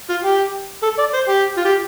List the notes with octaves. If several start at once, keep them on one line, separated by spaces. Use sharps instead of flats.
F4
G4
A4
D5
C5
G4
F4
G4